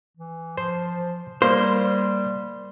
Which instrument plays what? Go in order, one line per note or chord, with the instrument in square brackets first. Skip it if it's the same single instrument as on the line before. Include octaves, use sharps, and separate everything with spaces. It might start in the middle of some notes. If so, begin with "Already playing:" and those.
[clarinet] E3
[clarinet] F3 [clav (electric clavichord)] C5
[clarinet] G3 [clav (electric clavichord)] A#3 [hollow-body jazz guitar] C5